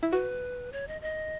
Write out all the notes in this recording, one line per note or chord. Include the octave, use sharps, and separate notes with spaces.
E4
F#4 B4
C#5
D#5
D#5